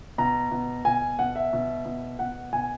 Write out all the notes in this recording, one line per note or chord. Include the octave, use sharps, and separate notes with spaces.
B2 A#5
B2
B2 G#5
B2 F#5
E5
B2
B2
B2 F#5
B2 G#5